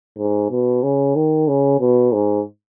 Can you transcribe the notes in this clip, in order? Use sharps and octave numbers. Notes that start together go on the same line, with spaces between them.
G#2
B2
C#3
D#3
C#3
B2
G#2